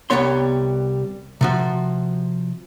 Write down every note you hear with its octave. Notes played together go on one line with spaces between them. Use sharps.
C2 E3 G3 B3 C#5 C6
C3 F3 F#4